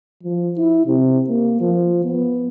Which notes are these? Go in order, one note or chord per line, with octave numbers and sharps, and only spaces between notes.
F3
E4
C3
A#3
F3
B3